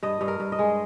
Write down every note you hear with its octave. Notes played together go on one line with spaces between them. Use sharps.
G2 D#5
G2
A#4
G2
D#5
G#3